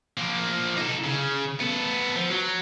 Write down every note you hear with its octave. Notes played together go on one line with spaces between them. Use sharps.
F3 A#3
D#4 A4
C#3
B3 A4
F3
F#3